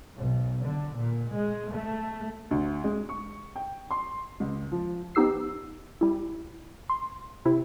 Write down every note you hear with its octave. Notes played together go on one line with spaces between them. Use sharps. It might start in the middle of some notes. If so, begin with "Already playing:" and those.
B1
D3
A#2
G#3
A3
D2
G#3
C#6
G5
C6
C#2
F3
F3 B3 D#4 G4 E6 C7
G3 E4
C6
C3 E4